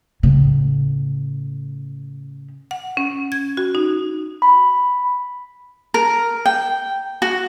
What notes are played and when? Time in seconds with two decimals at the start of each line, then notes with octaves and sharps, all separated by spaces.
0.23 A2 C#3
2.71 F#5
2.97 C#4
3.32 G#6
3.57 F#4
3.75 D#4
4.42 B5
5.94 A#4
6.46 G5
7.22 F#4